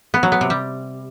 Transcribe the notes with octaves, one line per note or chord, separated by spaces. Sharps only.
B3
F#3
B3
C3
G3